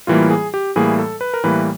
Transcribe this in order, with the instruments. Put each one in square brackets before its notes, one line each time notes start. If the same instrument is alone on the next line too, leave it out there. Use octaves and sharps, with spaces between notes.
[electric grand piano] A2 E3 G3 A#3 F4
G#4
G4
A2 E3 G3 A#3 G#4
A4
B4
A#4
A2 E3 G3 A#3 B4